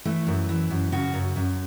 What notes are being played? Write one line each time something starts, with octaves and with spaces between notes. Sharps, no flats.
E3 A3
F#2
E3
F#2
C#3 F#4
F#2
F#2